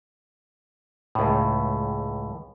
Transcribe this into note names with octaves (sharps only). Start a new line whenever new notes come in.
C#2 A2